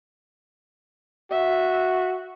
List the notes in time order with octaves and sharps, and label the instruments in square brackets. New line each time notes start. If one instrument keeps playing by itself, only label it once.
[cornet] F#4 [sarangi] E5